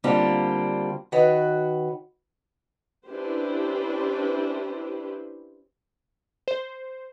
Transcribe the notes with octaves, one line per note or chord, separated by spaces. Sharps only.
D3 G3 A#3 C4 F4
D#3 F#4 B4 C#5
C#4 D4 E4 G4 B4 C5
C5